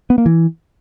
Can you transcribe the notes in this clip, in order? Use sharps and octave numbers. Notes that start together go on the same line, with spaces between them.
B3
A#3
E3